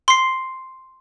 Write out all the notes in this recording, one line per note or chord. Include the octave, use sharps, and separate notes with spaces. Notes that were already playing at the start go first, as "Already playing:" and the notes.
C6 C7